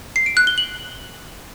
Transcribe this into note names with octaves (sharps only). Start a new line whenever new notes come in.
C7
D7
F#6
G7
F#7